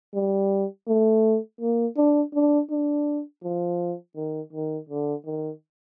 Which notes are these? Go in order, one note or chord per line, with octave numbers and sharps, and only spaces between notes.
G3
A3
A#3
D4
D4
D4
F3
D#3
D#3
D3
D#3